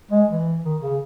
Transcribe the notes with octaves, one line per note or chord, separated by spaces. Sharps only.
G#3
E3
D#3
C#3